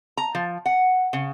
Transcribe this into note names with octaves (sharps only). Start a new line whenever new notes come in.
A#5
F3
F#5
C#3